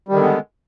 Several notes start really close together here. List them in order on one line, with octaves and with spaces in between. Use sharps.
G3 D#3 D3 B3 G#3